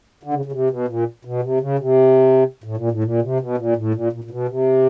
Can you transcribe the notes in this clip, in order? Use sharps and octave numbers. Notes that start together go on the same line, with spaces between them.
D3
C#3
C#3
C3
B2
A#2
B2
C3
C#3
C3
A2
A#2
A2
A#2
C3
B2
A#2
A2
A#2
A#2
A#2
B2
C3